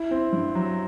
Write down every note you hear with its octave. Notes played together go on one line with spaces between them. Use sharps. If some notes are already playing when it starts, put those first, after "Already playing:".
Already playing: E4
C4
G2
F#3